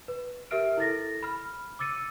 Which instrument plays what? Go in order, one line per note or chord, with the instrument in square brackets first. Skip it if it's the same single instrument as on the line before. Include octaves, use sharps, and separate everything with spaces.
[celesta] B4
G4 A#4 E5 F6 D7
E4 A4 A6 A#6
B5 F6
D6 E6 A6 C#7 D#7